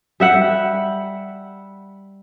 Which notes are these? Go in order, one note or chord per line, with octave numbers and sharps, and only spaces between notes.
G3 E5 F#5